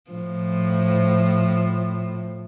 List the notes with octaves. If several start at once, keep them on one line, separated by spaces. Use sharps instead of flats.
A2 F3